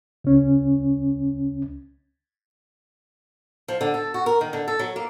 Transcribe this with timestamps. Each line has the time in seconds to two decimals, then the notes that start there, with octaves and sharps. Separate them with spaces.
0.24 C#2 C#4
3.68 F3
3.81 D3
3.94 A4
4.14 F#4
4.26 A#4
4.41 D#3
4.53 D3
4.68 A4
4.79 F#3
4.96 A#3